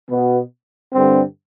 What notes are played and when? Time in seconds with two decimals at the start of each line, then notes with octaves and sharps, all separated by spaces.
0.10 B2 B3
0.94 G2 D3 G3 C4